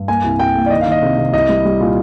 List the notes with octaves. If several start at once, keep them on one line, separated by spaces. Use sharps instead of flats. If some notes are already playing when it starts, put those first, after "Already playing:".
Already playing: G2
A#3 G#5
C2
C2 G5
A#3
D5
D#3 D#5
F5
D#3
D#5
C3
C3
C2 D#5
G3
G3
A#2